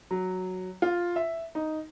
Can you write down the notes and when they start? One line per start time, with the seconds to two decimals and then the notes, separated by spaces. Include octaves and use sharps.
0.11 F#3
0.82 F4
1.16 E5
1.55 D#4